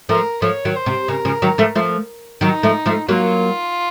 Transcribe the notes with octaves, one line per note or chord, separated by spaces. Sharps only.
F3 A3 A#4
F3 A3 C#5
D#3 F#3
C5
C3
C#3 A#4
C#3 F3
D#3 F#3
F3 A3
F3 A3
D#3 F#3 D#4
F3 A3
F3 A3
F#3 A#3 F4